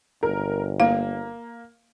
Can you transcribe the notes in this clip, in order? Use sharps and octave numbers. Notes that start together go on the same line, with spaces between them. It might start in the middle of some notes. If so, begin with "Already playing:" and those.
G1 A#4
A#3 F5